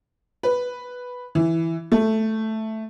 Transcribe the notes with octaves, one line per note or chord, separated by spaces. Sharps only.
B4
E3
A3